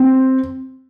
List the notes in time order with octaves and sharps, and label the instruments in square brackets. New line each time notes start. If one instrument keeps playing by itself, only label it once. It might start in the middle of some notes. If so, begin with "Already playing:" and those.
Already playing: [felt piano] C4